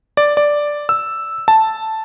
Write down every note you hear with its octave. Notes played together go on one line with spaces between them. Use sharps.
D5
D5
E6
A5